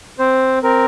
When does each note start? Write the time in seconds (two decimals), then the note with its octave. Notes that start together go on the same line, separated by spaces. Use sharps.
0.19 C4 C5
0.63 C4 A#4